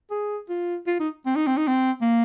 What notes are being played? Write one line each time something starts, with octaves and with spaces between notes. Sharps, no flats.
G#4
F4
F4
D#4
C4
D#4
C4
D#4
C4
A#3